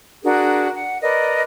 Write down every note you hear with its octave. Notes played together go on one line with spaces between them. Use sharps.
D4 F#4 G#4 A#4
F#5
A#4 B4 D5 D#5